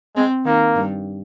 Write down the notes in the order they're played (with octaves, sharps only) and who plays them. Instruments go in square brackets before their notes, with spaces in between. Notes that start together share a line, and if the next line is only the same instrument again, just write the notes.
[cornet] G#3 [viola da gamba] C4
[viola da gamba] D#3 [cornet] A#3
[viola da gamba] G2